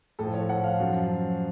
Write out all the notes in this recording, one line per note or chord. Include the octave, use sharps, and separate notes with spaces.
A2 F3 A4
C#5
F#5
F5
F#2 F3